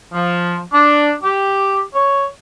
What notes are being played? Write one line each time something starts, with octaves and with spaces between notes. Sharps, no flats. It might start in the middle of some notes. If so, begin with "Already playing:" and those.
F3
D4
G4
C#5